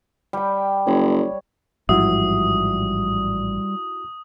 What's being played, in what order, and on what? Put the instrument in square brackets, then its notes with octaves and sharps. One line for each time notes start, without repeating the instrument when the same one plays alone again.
[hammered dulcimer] G3 G5
[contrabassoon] F#1 [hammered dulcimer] C#5
[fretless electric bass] A1 G#2 F3 [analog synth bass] G3 [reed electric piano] E4 F#4 E5 [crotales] D#6